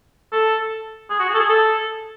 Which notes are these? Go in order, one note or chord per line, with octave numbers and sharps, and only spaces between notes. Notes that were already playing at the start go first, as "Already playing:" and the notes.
A4
G#4
F#4
G#4
A4
G#4
A4